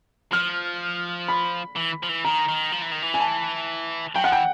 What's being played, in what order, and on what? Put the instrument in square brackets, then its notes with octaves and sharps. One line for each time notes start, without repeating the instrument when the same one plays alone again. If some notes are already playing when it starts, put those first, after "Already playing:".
[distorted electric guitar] F3 [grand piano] F6
[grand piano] B5
[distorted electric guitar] E3
F3
E3
[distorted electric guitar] D#3 [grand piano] A#5
[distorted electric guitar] D#3
F3
E3
D#3
E3
[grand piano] G#5
A5
[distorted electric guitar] F#3 [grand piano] G5
[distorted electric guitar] F3 [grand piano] F#5
[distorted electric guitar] E3 [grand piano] G5